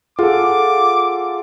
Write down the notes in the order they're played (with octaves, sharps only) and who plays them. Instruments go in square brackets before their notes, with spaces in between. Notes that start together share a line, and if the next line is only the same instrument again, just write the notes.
[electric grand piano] F4 A4 [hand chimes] G#4 F#5 [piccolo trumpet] D6